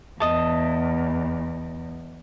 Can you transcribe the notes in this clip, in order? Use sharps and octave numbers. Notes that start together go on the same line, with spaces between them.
E2 D#5 A5